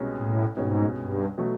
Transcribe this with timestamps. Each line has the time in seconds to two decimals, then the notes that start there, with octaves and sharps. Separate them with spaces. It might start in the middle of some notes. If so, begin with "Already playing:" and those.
Already playing: C2 B2 G#3 C#4
0.17 A2
0.57 C2 G#2 B2 G#3 C#4
0.97 G2
1.38 B2 F#3 A3